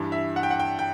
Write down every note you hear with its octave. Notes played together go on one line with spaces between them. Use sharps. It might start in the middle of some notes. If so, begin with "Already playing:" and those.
Already playing: G2 E3 G3
E5
F#5
G5
F#5
G5
G5